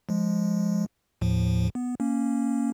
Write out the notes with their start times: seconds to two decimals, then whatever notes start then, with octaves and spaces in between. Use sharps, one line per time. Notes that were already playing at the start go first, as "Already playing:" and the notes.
0.09 F3 G#3
1.21 D#2 A2 F3
1.75 B3
2.00 A#3 C#4